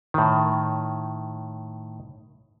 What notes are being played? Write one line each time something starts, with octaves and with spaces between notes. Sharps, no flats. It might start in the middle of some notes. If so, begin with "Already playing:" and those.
A2 D#3